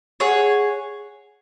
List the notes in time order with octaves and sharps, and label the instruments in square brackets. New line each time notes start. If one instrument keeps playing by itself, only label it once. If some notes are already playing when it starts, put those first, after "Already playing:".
[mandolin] G#4 C#5 F#5